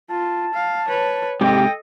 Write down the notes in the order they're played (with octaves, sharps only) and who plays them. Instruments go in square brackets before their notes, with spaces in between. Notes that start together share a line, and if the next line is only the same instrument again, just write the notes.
[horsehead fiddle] F4 [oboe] A5
[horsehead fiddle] F5
B4 C#5
[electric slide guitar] G#2 C3 G4 [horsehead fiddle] A4 D#5 [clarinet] G5